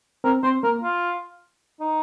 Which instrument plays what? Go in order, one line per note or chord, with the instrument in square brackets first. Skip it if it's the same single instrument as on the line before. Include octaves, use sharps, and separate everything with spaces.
[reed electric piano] C4 [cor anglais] A#4
[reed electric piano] C4 [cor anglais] C5
[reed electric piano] A#3 [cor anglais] A#4
[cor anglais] F4
D#4